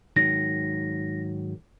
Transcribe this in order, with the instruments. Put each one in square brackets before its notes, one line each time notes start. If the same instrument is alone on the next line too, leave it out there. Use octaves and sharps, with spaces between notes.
[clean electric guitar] G#2 D#3 F#3 [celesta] A#6